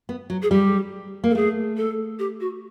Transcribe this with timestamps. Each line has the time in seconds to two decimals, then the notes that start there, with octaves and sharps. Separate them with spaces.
0.09 B3
0.30 F#3
0.42 G#4
0.51 G3 G4
1.24 A#3
1.30 A4
1.35 A3 G#4
1.77 A4
2.19 G4
2.40 F#4